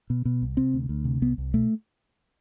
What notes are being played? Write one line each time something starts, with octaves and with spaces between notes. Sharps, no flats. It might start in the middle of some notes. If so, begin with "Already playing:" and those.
B2
B2
C2
C3 C4
D2
D2
C3
C2 B3
C2
B2 A3